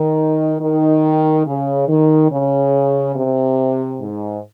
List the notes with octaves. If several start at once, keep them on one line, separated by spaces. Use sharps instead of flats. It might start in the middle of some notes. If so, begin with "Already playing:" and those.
Already playing: D#3
D#3
C#3
D#3
C#3
C3
G#2